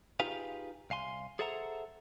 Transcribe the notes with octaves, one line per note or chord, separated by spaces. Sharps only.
D#4 F4 G4 G#4 B4 F5
C2 F5 G#5 C6
G#4 A4 C5 E5 F#5 A#5